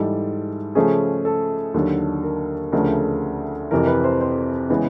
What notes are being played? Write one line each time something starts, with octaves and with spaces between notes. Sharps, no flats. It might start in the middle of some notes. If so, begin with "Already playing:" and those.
Already playing: G#2 E3 G3 A4
C#3 F3 A3 C#4 G#4
A4
D#2 D3 F#3
A#4
D2 C#3 F3 A3 D4 A#4
F2 C3 E3 A#4
B4
C5
C5
C#3 E3 G#3 B3